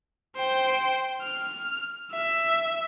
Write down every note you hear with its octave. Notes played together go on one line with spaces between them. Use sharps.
C5 G5
F6
E5